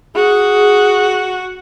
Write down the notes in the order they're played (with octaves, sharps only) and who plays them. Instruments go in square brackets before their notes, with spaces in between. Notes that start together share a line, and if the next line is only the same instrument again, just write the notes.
[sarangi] F#4 [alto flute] G#4